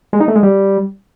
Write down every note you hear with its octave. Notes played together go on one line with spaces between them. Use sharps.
G#3
D#4
A3
G#3
G3